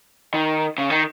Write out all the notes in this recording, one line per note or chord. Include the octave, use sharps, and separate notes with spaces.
D#3
C#3
D#3